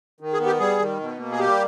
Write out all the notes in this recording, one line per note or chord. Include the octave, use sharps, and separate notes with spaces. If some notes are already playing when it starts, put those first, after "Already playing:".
D#3
G#4
B3
G4
G3 G#4
D#3
B2
A#3
G#4
G3 G4